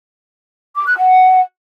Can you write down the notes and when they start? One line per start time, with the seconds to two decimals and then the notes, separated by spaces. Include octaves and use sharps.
0.76 D6
0.87 F#6
0.98 F#5